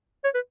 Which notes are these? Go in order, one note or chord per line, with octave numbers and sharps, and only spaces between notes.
C#5
B4